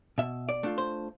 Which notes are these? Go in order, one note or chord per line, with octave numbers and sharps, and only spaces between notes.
B2 E5
D5
A3 D4 F4
C5